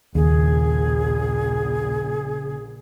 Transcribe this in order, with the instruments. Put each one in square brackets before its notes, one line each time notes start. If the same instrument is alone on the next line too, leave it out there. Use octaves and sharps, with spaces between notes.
[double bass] A#1 [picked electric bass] D#2 [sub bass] C#3 [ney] G#4